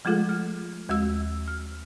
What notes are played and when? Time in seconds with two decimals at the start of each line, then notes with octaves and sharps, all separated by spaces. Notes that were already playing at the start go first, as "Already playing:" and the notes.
0.05 F3 G#3 A3 F4 G#4 A4
0.29 F6
0.89 D#2 G#3 F#4 E6
1.48 F6